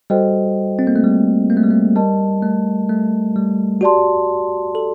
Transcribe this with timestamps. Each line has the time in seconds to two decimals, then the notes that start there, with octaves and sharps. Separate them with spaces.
0.10 G3 F#4 A4 C5 D#5 G5
0.79 C4
0.87 A#3
0.96 A3
1.04 G3
1.50 A#3
1.57 A3
1.64 G3
1.71 A3
1.95 G3 A#4 D#5 A5
2.42 A3
2.89 A3
3.36 G3
3.81 F#4 G4 D5 A5 C6
4.75 A4